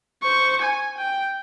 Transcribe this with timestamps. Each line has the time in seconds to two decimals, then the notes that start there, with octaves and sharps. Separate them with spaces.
0.23 C5 C#6
0.62 G#5
0.97 G5